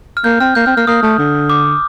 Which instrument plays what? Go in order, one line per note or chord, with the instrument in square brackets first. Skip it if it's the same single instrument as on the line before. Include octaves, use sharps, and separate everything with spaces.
[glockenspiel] F6
[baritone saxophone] A#3 [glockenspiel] G6
[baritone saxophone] C4 [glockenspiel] F6
[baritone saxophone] A#3 [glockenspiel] G6
[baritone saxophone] C4 [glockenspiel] F6
[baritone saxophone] A#3 [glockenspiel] F6
[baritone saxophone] A#3 [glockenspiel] D#6
[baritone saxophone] A3
D3
[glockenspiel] D6